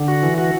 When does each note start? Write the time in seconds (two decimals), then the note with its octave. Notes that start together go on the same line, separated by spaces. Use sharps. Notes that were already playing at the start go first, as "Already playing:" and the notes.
Already playing: D3
0.08 F#4
0.23 E3
0.38 F#4